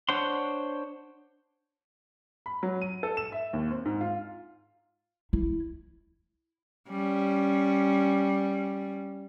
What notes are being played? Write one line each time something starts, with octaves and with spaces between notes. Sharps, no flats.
D4 C5 C#5 F#5 C6
B5
F#3
D#7
A4
E7
E5
D#2
C4
G#2
F4
E4
G3 C#4